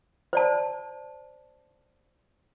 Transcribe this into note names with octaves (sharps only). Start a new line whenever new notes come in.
C5 D5 A5